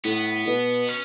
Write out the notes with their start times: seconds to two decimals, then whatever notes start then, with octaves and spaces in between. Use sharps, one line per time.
0.04 A2 B3
0.47 B2
0.89 C#4